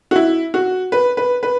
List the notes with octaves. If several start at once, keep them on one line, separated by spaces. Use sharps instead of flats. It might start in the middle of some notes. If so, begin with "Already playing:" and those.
F#4
E4
F#4
B4
B4
B4